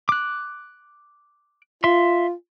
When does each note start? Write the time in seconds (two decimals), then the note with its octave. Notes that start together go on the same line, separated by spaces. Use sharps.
0.09 D6 F#6
1.84 F4 E5 C6